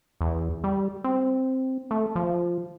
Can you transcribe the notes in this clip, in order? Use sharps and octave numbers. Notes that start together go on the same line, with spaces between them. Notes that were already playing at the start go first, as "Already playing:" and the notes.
E2
G3
C4
A3
F3